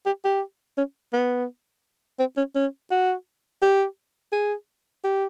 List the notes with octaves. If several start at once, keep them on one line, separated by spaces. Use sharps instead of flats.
G4
G4
C#4
B3
C4
C#4
C#4
F#4
G4
G#4
G4